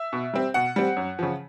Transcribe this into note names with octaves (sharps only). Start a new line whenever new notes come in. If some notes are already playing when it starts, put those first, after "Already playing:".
Already playing: E5
B2
G3 C4
B2 F#5
G3 C4
F#2
C#3 F3